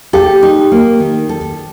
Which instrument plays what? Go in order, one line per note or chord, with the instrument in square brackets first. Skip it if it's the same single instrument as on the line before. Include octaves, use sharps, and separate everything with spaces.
[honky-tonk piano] G4 [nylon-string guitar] A4
[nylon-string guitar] D#4
A#3
D#3
A4